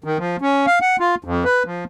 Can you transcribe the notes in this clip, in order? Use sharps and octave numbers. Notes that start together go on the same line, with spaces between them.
D#3
F3
C#4
F5
F#5
F4
F2
B4
F3